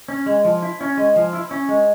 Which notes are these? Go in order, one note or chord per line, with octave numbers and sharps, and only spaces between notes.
C#4
G#3
F3
E4
C#4
G#3
F3
E4
C#4
G#3